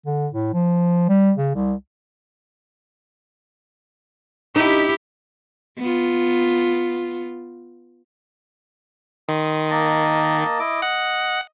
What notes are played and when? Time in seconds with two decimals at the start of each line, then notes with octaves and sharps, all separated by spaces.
0.06 D3
0.33 A2
0.54 F3
1.09 G3
1.37 C#3
1.55 C2
4.56 D#4 E4 G4
5.79 B3 F4
9.29 D#3 C6 D#6
9.71 A#3 D#5 A5
10.59 E4 D#5 D6
10.82 D#5 F#5